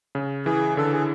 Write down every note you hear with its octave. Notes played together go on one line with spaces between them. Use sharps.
C#3
E3 G#4
D3 A4
G#4